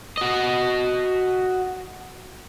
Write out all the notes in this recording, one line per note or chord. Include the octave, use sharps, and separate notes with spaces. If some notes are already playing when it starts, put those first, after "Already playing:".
F#4 D#5